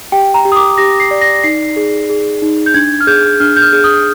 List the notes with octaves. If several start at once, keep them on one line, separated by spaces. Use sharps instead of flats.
G4 G5
A#5
G4
D#6
D6
G4 A#6
C7
D5
A#6
D#4 C7
G#4
G#4
D#4
G6
D4 G#6
F6
G#4 G6
D4 F6
G6
F6
G#4
D#6